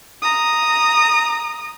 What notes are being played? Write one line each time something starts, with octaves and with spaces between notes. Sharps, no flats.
A#5 D#6